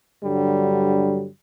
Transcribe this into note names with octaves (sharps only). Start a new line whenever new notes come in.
G2 D3 F#3 G3